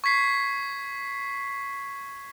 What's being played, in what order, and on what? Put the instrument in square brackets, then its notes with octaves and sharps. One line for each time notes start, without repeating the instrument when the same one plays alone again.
[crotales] C#6 G#6 B6 C7